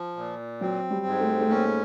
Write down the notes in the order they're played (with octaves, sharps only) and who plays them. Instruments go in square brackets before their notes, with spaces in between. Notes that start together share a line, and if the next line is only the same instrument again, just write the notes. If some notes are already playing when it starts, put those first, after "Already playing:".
Already playing: [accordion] F3
A#2
[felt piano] F#3 [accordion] C4
[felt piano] G3
[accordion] G#2
[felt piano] A3
A3
[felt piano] A#3 [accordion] C#4